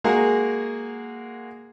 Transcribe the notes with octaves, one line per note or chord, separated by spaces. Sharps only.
G#3 A#3 F#4 G#4 A#4 F#5